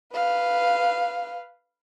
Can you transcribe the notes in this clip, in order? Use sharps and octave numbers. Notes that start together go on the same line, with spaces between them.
B4 F5